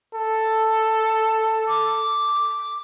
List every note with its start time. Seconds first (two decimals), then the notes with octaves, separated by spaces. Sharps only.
0.15 A4
1.68 D6